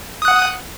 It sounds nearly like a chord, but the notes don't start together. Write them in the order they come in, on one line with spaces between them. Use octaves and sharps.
D#6 F#6 F#5